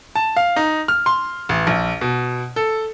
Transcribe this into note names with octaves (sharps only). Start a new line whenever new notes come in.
A5
F5
D#4
F6
C6
A1
A#1
B2
A4